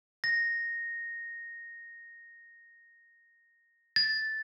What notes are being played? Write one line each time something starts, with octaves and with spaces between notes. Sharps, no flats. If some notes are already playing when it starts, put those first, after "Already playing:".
A#6
A6